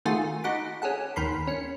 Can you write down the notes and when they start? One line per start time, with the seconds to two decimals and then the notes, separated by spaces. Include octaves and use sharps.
0.05 D#3 A3 F4 F#4 G#4 A5
0.44 D#4 F#4 F#5 B5 D6
0.82 C#4 G#4 A4 F#5
1.16 D#2 D#3 A#4 B5 C6
1.47 C#4 C#7